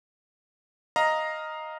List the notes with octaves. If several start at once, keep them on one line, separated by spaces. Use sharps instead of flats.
D#5 F5 A#5